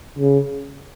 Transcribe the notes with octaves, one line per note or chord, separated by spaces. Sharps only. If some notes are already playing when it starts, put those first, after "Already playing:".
C#3